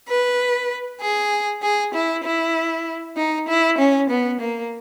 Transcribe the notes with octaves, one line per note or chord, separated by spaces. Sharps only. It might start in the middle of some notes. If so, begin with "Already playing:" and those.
B4
G#4
G#4
E4
E4
D#4
E4
C#4
B3
A#3